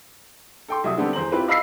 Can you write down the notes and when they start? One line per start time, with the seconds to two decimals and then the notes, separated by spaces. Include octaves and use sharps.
0.69 A4 G5 C6
0.84 C2 F#3 E5 D#6
0.97 D3 G3 B3 C4 G4 A4
1.13 E2 C5 A#5 F#7
1.32 C4 E4 F4 G4 B4
1.48 D#5 F5 B5 E6 B6 C7